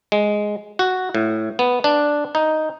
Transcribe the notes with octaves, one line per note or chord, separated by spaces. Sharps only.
G#3
F#4
A2
B3
D4
D#4